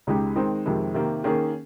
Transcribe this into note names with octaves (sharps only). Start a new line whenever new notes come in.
C#2 C#3 G#3 D#4 G4
D#3 G#3 C4 D#4
F2 C3 D#3 G#3
C3 D#3 A#3
D#3 A#3 C#4 G#4